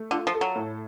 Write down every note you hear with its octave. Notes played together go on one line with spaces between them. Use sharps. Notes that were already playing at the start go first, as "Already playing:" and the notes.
Already playing: A3
D3 F4
F3
A4
F#3
A2